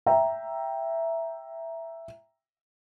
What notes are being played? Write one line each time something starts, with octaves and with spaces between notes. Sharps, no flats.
E5 G5 A#5